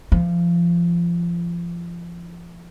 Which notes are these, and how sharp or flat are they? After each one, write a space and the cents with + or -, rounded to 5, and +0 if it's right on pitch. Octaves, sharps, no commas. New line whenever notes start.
F3 -25